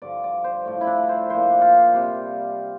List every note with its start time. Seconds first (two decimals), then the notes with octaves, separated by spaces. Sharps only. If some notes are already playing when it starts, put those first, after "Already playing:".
0.02 G2 D3 F3 D5
0.24 D5
0.44 C5
0.66 A2 F3
0.81 E4
0.87 D4
1.09 C5
1.30 A#2 F3 C5
1.61 F4
1.94 C3 G3